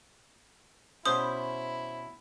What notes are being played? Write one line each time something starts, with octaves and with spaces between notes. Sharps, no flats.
B2 C#4 E4 C5 D#6